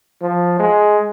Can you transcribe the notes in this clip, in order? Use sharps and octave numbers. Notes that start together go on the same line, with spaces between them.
F3
G#3